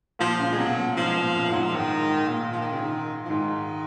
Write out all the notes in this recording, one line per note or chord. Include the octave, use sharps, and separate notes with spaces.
A#2 F3
C#3
G#3
B2 F#3
A#2
G#2 F3
A#2
F#2
F#2 G#2 F#3
F3
G#2 D#3
G#2
A#2
F3
D#3
C#3
D#3
F3
G#2 D#3